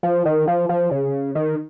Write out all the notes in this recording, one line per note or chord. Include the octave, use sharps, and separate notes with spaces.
F3
D#3
F3
F3
C#3
D#3